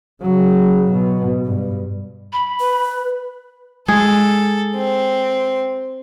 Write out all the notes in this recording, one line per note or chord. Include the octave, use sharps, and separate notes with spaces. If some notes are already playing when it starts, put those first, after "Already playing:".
C#3 F#3
B2
G2
B5
B4
G#3 G#4 A4
C4